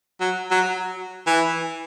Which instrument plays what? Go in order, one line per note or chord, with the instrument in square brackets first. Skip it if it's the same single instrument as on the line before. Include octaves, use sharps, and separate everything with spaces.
[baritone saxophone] F#3
F#3
E3